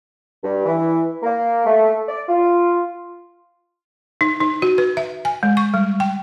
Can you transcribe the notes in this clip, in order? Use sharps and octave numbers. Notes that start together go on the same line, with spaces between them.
G2
E3
A#3
A3
D5
F4
D#4
D#4
F#4
B4
E5
G#5
G#3
C#6
G3
G5